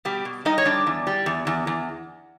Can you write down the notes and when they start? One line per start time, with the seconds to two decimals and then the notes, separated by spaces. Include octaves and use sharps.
0.05 B2 G3 G4
0.25 B2
0.45 G3 D#4 D#5
0.58 C#5
0.65 G3 D4 D5
0.87 E2
1.07 G3
1.26 E2
1.47 E2
1.67 E2